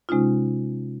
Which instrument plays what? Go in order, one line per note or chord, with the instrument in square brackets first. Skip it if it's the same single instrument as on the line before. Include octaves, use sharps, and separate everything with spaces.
[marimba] C3 G#3 C#4 D#4 F4